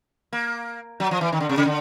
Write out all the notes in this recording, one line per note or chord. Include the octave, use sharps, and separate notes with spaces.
A#3
F#3
F3
E3
D#3
D3
C3
C#3
D3